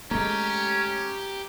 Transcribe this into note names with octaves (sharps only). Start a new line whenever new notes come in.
G#3 A3 C#4 G4 A#5